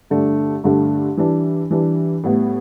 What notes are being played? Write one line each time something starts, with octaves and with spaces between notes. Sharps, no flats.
G2 D3 A3 D4
G2 D3 A3 D4
E3 G3 D4
E3 G3 D4
A2 G3 B3